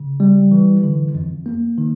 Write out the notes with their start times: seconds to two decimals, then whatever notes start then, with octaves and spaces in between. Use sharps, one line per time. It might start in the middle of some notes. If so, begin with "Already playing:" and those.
Already playing: C#3
0.20 G3
0.51 E3
0.83 D3
1.15 F2
1.46 A#3
1.78 D#3